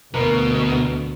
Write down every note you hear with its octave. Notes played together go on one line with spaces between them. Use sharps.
D2 B2 A#3 B3 A#4